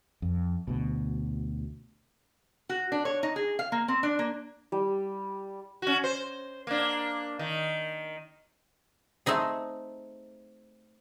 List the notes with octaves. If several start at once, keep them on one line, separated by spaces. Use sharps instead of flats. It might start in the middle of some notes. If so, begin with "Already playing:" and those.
F2
D2 B2
F#4
D4
C#5
D#4
G#4
F5
A#3
C4
D4
A#3
G3
C#4 F#4
C5
A#3 D4
D#3
A3 C4 D#4 G#4